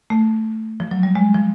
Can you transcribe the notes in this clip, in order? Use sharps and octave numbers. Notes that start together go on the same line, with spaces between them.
A3
F3
F#3
G3
G#3
F3